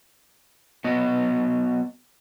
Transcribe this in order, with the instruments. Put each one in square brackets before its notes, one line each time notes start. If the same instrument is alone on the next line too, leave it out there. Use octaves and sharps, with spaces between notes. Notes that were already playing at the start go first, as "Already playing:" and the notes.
[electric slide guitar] F#3 B3 D#5